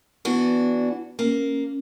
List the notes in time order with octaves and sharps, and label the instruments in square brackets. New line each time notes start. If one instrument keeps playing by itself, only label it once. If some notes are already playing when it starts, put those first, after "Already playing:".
[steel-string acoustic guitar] E3 D4 F#4 [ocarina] B3
[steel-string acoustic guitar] A#3 [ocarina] C#4